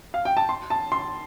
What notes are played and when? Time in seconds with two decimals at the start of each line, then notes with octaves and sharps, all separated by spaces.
0.14 F5
0.25 G5
0.37 A5
0.49 C6
0.70 A5
0.92 C6